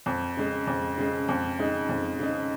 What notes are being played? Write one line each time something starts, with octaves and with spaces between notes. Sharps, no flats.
F2
C#3 G#3
F2
C#3 G#3
F2
C#3 G#3 D#4
F2
C#3 G#3 D#4